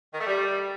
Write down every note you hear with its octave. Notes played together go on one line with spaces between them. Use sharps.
D#3
A3
G3